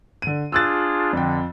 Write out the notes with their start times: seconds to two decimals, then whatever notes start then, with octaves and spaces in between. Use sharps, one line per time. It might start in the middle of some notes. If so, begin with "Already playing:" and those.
0.22 D3 D#7
0.52 D4 F4 G#4 E6 F#6 A6
1.13 F2 D3 G5